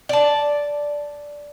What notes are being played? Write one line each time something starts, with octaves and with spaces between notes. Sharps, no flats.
D5 A5